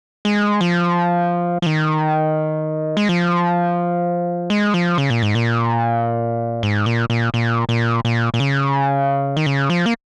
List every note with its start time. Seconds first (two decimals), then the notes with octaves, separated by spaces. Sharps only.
0.25 G#3
0.61 F3
1.62 F3
1.66 D#3
2.97 G#3
3.09 F3
4.50 G#3
4.74 F3
4.98 C#3
5.10 A#2
5.22 G#2
5.35 A#2
6.63 G#2
6.86 A#2
7.10 A#2
7.34 A#2
7.69 A#2
8.05 A#2
8.34 A#2
8.40 C#3
9.37 D#3
9.46 C#3
9.70 F3
9.86 A#3